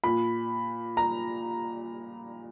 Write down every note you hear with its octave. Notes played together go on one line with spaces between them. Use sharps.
A#2 B5
A#5